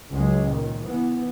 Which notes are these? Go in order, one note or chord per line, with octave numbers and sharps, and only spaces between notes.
C#2 F#3 G#3
A#2 D#3
E3 B3